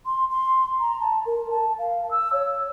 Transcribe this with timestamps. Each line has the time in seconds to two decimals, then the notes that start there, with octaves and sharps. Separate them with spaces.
0.06 C6
0.30 C6
0.80 A#5
1.00 A5
1.26 A#4
1.51 A5
1.79 F5
2.11 E6
2.33 C#5